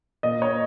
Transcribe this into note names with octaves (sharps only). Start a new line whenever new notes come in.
A#2 D#5
C#5